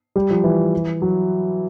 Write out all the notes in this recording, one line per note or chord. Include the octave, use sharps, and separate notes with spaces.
G3
F3
E3
F#3